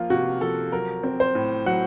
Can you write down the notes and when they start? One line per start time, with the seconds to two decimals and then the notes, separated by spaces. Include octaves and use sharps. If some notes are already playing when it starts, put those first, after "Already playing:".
Already playing: F3 A#3 F4
0.10 C3 F#4
0.41 F3 A4
0.72 F#3 A#4
1.03 C4
1.20 C5
1.35 A2
1.66 F#3 F#5